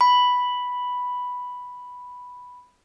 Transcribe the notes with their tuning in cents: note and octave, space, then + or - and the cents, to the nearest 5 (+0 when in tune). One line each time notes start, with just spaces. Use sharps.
B5 +0